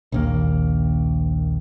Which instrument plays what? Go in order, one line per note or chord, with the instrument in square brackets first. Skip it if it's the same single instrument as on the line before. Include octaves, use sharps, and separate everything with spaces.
[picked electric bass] A#1 D#2 A#3